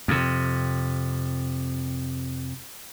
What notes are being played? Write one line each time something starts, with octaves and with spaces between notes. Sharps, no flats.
F2 C3